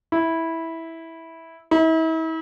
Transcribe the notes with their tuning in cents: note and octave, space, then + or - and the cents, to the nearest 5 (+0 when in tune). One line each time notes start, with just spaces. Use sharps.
E4 -10
E4 -40